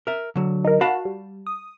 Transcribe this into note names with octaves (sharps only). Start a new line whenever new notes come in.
A#4 E5
D3 F#3
D#4 A#4
F#4 F5 A5 B5
G3
D#6